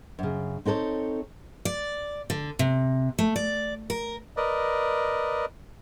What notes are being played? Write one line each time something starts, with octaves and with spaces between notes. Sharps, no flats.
F#2 C#3
C4 D#4 A4 B4 C#5
D5
D3
C3
A3
D5
A#4
A#4 B4 D5 D#5